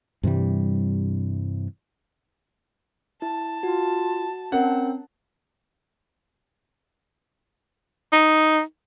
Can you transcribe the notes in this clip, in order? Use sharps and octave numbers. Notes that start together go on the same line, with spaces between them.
G2 C3 E3 G3
E4 A5
F4 F#4
C4 C#4 A#4 F#5
D#4